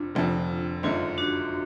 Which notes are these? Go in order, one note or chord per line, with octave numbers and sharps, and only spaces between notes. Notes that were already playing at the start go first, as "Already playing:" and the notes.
Already playing: F1 F2 F3 D4 F4
F1 F2 D3 F3
G#1 F#2 D3 G#3 F4
D4 F#4